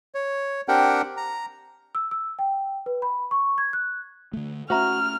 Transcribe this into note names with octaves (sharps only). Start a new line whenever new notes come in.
C#5
C4 D4 G4 A#4 F#5 G5
A#5
E6
E6
G5
B4
B5
C#6
G#6
F#6
D3 A3
A3 C#4 F#4 C5 E5 A#5 F6